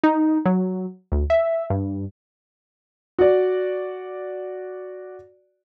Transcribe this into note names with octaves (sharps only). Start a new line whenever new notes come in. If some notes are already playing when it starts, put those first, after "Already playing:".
D#4
F#3
D2
E5
G2
F#4 D5